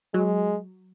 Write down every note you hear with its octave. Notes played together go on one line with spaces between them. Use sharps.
F#3 G#3